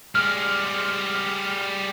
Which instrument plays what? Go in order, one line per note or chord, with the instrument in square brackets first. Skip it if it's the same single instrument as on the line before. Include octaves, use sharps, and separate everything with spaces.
[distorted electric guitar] G3 G#3 [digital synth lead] F6